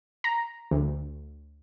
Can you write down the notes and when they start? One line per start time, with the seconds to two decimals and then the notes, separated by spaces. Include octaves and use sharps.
0.24 A#5
0.71 D2